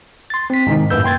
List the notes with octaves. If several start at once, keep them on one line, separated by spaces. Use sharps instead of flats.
C6 A6
C4 B6
G#2 C3 D#3 D#4
F#2 A2 A#3 B4 E6 G6
G5 C6 G#6 A6